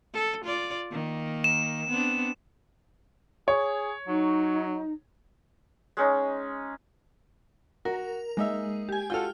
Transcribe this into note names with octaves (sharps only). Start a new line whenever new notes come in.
A4
F4 D5
D#3 A#3
E7
B3 C4 D4
G#4 C#5
F#3 D#4
G#3 C#4 D#4
F#4 A#4
G#3 A#3 D#4 E5
G4 G#5
F4 F#4 A4 G5 F6